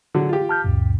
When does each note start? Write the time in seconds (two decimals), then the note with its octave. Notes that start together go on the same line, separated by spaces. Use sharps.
0.15 D3 F#3 G#4
0.29 F4 G4
0.49 A5 F6 G6
0.64 C#2 F#2 A#2